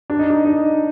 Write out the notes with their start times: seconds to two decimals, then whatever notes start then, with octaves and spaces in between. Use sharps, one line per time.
0.10 D4
0.19 D#4
0.29 D4
0.45 D#4